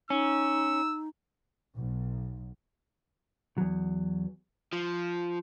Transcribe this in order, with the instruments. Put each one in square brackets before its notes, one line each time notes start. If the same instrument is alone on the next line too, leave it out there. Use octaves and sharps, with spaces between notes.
[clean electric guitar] C#4 [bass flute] D#4 [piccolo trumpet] E6
[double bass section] B1
[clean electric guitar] E2 F#3
[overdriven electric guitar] F3